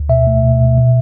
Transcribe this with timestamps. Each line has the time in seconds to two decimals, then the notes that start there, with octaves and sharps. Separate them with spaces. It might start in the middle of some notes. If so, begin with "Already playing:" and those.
Already playing: D2
0.09 B2 E5
0.27 A3
0.43 B2
0.60 B2
0.78 B2